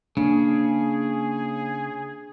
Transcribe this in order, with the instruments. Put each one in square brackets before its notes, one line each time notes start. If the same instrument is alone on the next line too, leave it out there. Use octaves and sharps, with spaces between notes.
[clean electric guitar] C#3 [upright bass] A#3 [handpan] D4 [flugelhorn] G#4